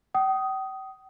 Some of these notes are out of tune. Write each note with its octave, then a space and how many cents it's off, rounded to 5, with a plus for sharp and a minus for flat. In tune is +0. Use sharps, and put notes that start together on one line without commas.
G5 -40 D#6 +5